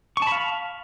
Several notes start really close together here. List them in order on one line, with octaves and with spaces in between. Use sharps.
C#6 A5 B5 F5